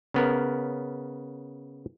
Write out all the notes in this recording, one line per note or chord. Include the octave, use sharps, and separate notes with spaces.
C#3 B3 A#4